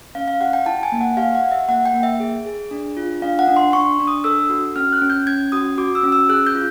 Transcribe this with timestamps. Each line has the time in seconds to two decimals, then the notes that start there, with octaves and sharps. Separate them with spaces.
0.15 C#4 F5
0.28 F5
0.41 G4 F#5
0.53 G5
0.66 E4 A5
0.83 G#5
0.92 A#3
1.01 F#5
1.17 G4 F5
1.35 F#5
1.43 G4
1.52 E5
1.68 A#3 F#5
1.86 G5
1.94 A#3
2.03 E5
2.20 G#4
2.46 G#4
2.71 D4
2.97 F4
3.22 D4 F5
3.39 F#5
3.48 D4
3.57 C6
3.73 D4 C#6
3.99 D4
4.07 D#6
4.24 A4 E6
4.50 F#4
4.76 C#4 F6
4.93 F#6
5.02 C#4
5.10 G6
5.27 C#4 G#6
5.52 F#4 D#6
5.78 F#4 D6
5.95 E6
6.03 C#4
6.12 E6
6.29 G#4 F#6
6.47 G6
6.55 F4